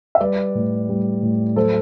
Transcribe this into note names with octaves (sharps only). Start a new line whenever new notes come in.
E5
G3 B4 D5
A2
G3
A2
F#3 A4 C5